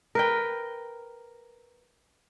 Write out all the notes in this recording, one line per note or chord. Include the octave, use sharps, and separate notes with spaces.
A#4 B4 G5